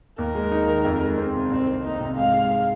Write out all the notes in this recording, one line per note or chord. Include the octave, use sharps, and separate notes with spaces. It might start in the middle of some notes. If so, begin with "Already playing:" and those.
D#2 A#4
G#3
D#4
D#3
F2
G#3
C4
C3
C2 C4
D#3
A#3 D#4
C3
G#2 F5
G#3